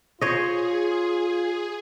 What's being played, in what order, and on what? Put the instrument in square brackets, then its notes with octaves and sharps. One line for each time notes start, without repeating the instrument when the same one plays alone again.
[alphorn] F4 [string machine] G#4 [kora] C5 C#5 D#5